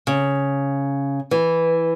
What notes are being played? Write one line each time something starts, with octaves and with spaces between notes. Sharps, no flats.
C#3
E3